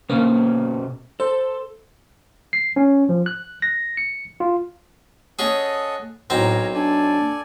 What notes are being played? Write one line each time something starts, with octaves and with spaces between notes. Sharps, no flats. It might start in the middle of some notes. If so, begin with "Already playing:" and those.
B2 D3 A#3 C#4
A4 C5
C7
C#4
F3
F#6
A#6
C#7
F4
C#4 G#4 A4 D#5 F#5
B1 A2 C4 A#4 G#5 A#5
D4 A4 D5 G#5